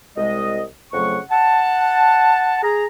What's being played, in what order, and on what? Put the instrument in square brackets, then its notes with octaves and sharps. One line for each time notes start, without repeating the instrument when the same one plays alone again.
[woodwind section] C2 G#3 D#5
F2 C#3 F#3 A3 F#5 C#6
F#5 A5
G#4 A#5